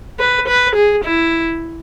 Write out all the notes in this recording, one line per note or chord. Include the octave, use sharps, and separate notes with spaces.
B4
B4
G#4
E4